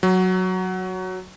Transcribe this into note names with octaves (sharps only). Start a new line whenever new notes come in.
F#3